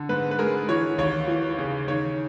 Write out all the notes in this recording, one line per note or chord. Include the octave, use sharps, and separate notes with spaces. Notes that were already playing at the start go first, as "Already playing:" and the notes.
Already playing: D3
G#2 B4
B4
G#3 A#4
E3 C#5
D#2 C#5
E3
C#3
D#3 C#5